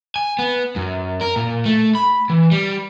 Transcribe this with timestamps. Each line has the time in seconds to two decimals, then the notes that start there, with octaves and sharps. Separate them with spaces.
0.16 G#5
0.39 B3
0.76 F#2
1.21 A#4
1.36 A#2
1.65 A3
1.95 B5
2.30 E3
2.51 G3